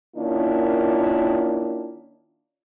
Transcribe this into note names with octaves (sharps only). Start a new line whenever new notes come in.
D#3 A#3 C#4 D4 E4 F4